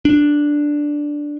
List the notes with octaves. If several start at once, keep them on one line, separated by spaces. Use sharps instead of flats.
D4